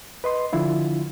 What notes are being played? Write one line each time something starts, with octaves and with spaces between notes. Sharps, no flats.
B4 D#5 C6
D3 F3 E4 F4